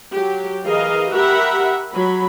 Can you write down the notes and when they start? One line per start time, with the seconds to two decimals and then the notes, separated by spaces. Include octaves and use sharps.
0.12 F#3 G4
0.65 E3 G#4 A#4 D#5 F5
1.11 G4 A#4 E5 F#5 B5
1.93 F#3 B5